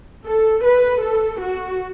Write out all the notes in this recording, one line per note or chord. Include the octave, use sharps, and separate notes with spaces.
A4
B4
A4
F#4